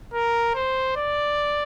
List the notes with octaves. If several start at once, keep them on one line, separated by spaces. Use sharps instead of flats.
A#4
C5
D5